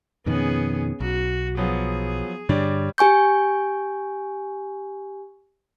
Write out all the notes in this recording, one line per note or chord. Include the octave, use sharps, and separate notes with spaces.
F2 B2 D#3 B3 C#4 G#4
B1 F#4
F3 F#3 B3 G#4
G2 D3 G3 D4 C#5 D5
G4 G#5 C#6 G6